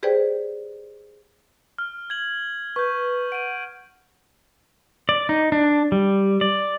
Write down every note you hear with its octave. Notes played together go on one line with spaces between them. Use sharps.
G4 G#4 B4 C5 D5 G5
F6
G#6 F#7
B4 C#6 G6
F#5 D7 D#7
D5
D#4
D4
G3
D5